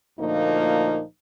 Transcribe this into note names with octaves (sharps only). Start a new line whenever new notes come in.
D2 A#2 F3 A#3 D#4